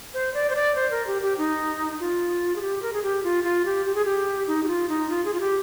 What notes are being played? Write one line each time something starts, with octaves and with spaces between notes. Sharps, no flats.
C5
D5
C5
D5
C5
A#4
G4
G4
D#4
F4
G#4
G4
A#4
G#4
G4
F4
F4
G4
G4
G#4
G4
D#4
G4
F4
D#4
F4
G#4
F4
G4